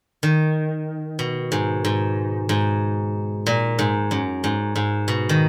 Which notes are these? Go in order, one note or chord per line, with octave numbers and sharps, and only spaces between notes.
D#3
B2
G#2
G#2
G#2
A#2
G#2
F#2
G#2
G#2
B2
D#3